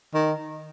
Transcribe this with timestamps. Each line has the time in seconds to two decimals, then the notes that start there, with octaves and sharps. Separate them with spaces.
0.14 D#3